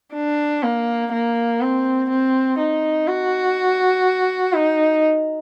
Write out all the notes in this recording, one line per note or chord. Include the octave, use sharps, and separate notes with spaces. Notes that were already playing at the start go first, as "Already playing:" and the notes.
D4
A#3
A#3
C4
C4
D#4
F#4
D#4